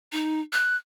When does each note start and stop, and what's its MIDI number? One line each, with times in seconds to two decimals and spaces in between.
0.12 0.40 63
0.53 0.77 90